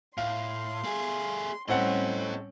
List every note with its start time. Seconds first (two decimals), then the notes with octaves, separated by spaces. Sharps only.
0.18 A2 F5 C6
0.84 A3 G#4
1.68 A2 G3 C4 C#4 A4 D#5 F#5